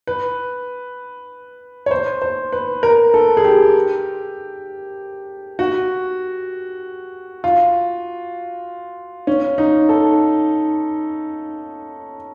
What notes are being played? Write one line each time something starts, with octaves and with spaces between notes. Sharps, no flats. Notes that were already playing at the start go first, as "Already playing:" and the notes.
B4
C#5
C5
C5
B4
A#4
A4
G#4
G4
F#4
F4
C#4
D#4
A4